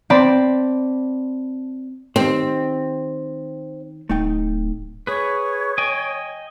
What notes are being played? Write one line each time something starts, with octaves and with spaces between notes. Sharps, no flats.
C4 D5 A5 B5
D#3 C4 G4 C5
D1 A3 D#4 G5
G#4 B4 C#5
D#5 G5 G#5